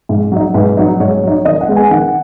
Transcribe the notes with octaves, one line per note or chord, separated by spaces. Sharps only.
G#2
F#3 D#4
G#2 B4
F#3 D#4
G#2 C#5
F#3 D#4
D#3 D#5
F#5
G#3 B3
G#5
D#3 F#5